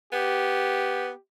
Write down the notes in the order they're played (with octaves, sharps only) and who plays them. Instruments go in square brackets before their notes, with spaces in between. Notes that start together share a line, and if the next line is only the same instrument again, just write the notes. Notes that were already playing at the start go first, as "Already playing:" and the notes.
[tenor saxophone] B3 [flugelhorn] G4